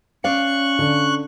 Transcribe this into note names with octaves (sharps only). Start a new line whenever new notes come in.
C#4 D5 F5 C#6 F#6
D3